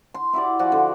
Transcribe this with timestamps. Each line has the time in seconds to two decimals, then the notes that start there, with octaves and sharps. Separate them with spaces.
0.14 C6
0.33 E4 F#4 G4 D5
0.59 F3 F#4 D5
0.72 D3